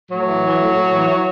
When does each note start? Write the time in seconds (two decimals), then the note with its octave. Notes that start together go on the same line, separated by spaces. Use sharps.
0.09 A2 F#3
0.26 E3
0.42 E3
0.59 A2
0.75 A2
0.92 E3
1.08 E3